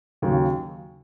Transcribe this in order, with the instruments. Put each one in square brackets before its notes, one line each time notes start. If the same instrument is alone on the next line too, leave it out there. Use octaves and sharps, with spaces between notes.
[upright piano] D#2 C#3 F#3